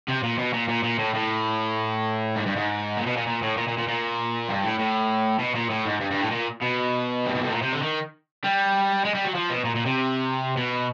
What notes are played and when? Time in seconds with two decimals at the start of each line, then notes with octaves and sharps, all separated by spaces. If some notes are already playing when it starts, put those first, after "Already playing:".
0.08 C3
0.23 A#2
0.38 B2
0.54 A#2
0.69 A#2
0.84 A#2
0.99 A2
1.14 A2
2.36 G#2
2.46 G2
2.56 G#2
2.96 A#2
3.06 B2
3.17 A#2
3.27 A#2
3.42 A2
3.57 A#2
3.68 A#2
3.78 A#2
3.88 A#2
4.48 G2
4.64 A2
4.79 A2
5.39 B2
5.55 A#2
5.70 A2
5.85 G#2
6.00 G2
6.11 G2
6.21 A2
6.31 A#2
6.62 B2
7.26 G2
7.35 G#2
7.44 A2
7.52 A#2
7.62 C3
7.73 D3
7.82 D#3
8.44 G3
9.05 G#3
9.15 G3
9.25 F#3
9.35 F3
9.50 B2
9.65 A#2
9.75 A#2
9.86 C3
10.57 B2